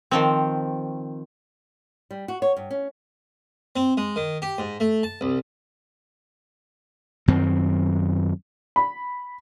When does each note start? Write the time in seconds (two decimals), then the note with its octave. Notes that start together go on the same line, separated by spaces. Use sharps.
0.11 D#3 F3 C4
2.11 G3
2.28 F#4
2.42 C#5
2.56 G2
2.71 C#4
3.76 C4
3.97 G#3
4.16 D#3
4.42 G4
4.58 G#2
4.80 A3
5.03 A5
5.21 C2
7.28 F#2 D#3 C4
8.76 B5